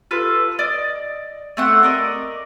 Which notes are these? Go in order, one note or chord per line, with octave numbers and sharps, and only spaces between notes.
F4 A4 B4
D5 D#5
A3 C4 F#5
A#4 D5 D#5